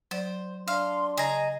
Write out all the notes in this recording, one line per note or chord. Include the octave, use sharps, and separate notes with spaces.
F#3 C5 D5
D4 F5 C6
C#3 G#4 D#5 A#5